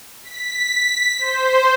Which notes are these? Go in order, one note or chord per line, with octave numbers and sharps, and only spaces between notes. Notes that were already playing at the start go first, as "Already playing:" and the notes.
B6
C5